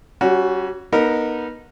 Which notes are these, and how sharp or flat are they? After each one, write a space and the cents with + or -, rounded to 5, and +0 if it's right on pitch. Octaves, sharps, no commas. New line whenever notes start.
G3 -30 C#4 +0 F#4 +0
B3 -30 D#4 +0 A#4 -20